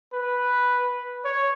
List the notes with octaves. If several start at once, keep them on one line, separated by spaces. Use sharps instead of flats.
B4
C#5